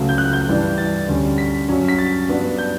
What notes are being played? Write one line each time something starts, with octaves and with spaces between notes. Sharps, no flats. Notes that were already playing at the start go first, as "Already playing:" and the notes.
Already playing: C#2 C#3 F#3 A3
G6
F#6
G6
G2 E3 G3 D4
A6
D2 D3 G3 C#4
B6
G2 F#3 C#4
B6
A6
G2 F#3 B3 D4
G6